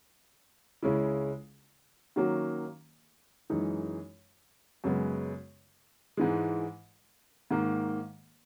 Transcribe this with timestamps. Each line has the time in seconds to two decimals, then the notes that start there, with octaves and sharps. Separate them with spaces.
0.82 C#2 C#3 G#3 C#4 E4
2.16 D#3 F#3 A#3 C#4 F#4
3.50 F#2 E3 G#3 D#4
4.84 F#2 C#3 G#3 B3
6.17 G#2 E3 G#3
7.51 G#2 D#3 A#3